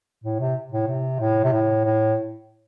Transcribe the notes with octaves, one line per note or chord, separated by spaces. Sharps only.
A2
C3
A2
C3
A2
C3
A2
A2